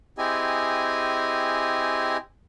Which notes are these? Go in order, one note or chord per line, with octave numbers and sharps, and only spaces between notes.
C4 E4 G4 G#4 D#5 G#5